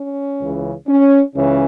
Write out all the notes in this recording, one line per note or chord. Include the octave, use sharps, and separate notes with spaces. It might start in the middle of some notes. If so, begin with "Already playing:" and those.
Already playing: C#4
C#2 C#3 E3
C#4
C#2 C#3 E3 C#4